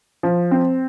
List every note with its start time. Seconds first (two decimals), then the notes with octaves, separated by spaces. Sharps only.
0.23 F3
0.51 C4